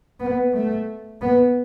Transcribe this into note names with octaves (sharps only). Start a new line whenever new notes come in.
B3
A3
B3